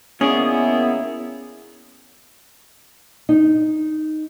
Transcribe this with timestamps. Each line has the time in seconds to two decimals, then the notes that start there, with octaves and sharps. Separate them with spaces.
0.21 D#3 A#3 B3 C#4 E4 G#4 D5
3.29 D#4